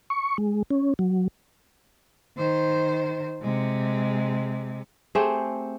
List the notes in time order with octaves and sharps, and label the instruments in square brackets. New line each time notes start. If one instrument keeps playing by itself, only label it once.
[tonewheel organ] C#6
G#3
C#4
F#3
[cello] D#3 C5
C3 G#3
[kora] A3 C4 G4 G#4